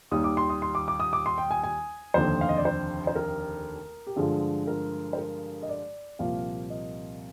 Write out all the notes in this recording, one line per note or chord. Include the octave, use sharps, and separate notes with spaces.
D#2 D#3 G3 D#6
D6
C6
D#6
C6
D6
D6
D#6
D6
C6
G5
G#5
G#5
F1 D#2 D3 C5
F5
D#5
D5
C5
C5
A#4
G4
G2 D3 F3 G#3 G#4
A#4
C5
A#4
D#5
D5
C2 A#2 F3 A#3 F5
D#5